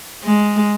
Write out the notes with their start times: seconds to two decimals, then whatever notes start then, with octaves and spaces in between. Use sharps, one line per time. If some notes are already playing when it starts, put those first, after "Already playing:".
0.24 G#3